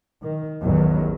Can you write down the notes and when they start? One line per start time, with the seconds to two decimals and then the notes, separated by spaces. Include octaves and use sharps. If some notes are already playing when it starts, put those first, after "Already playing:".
0.23 D#3
0.62 A1 E2 D#3 F#3